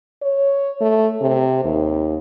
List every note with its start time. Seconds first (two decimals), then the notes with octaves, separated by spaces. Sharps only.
0.22 C#5
0.80 A3
1.21 C3
1.64 D#2